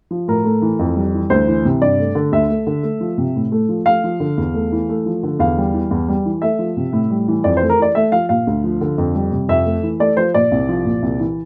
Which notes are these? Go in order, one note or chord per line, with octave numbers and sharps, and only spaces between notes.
F3
A2 A#4
A3
E3
F2
G3
E3
D2 C5
E3
C3
G2 D5
A3
D3
D2 E5
A3
D3
A3
F3
C3
A2
A3
F3
A3 F5
F3
D3
E2
A3
E3
A3
F3
D3
E2 F5
G3
E3
E2
G3
E3
A3 E5
F3
C3
A2
G3
E3
F2 D5
C5
A3
A#4
E3 D5
A3 E5
F3 F5
A#2 F5
D2
F3
D3
F2
G3
C3
F2 E5
A3
E3
A3 D5
F3 C5
A#2 D5
C2
F3
A#2
C2
E3